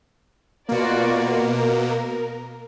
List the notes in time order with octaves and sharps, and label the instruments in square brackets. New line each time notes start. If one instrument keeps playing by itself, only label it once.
[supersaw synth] B2 A#3 [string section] F4 F#4 D5
[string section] A#4